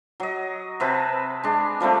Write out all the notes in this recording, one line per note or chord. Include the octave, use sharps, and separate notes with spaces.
F#3 D#5
C3 C4 B4 A5
G#3 D4
F3 G3 A3 C4